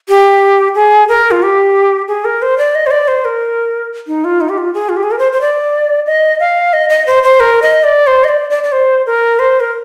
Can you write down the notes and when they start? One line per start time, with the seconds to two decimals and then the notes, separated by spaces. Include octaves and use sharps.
0.09 G4
0.75 G#4
1.09 A#4
1.31 F4
1.43 G4
2.08 G#4
2.25 A#4
2.42 C5
2.58 D5
2.75 D#5
2.86 C5
2.91 D5
3.08 C5
3.25 A#4
4.07 D#4
4.24 F4
4.41 D#4
4.49 G4
4.58 F4
4.74 G#4
4.89 F4
4.97 G4
5.03 G#4
5.11 A#4
5.19 C5
5.32 C5
5.41 D5
6.06 D#5
6.40 F5
6.73 D#5
6.90 D#5
7.07 C5
7.23 C5
7.40 A#4
7.62 D#5
7.84 D5
8.07 C5
8.24 D#5
8.28 D5
8.50 D5
8.63 D5
8.72 C5
9.06 A#4
9.39 C5
9.60 A#4